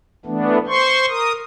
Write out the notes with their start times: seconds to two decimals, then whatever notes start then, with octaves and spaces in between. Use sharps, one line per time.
0.26 E3 A3 B3 D4
0.67 C5 C6 C#6
1.09 A#4 D#6